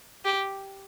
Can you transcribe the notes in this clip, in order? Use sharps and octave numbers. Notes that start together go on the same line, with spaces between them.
G4